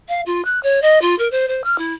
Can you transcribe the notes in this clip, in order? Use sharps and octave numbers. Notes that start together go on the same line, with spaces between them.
F5
F4
F#6
C#5
D#5
F4
A#4
C5
C5
F6
E4